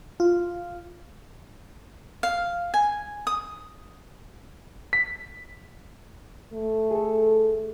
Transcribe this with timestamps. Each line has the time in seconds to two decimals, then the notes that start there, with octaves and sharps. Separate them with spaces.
0.20 F4
2.23 F5
2.74 G#5
3.27 D#6
4.93 B6
6.53 A3
6.91 G#4 A4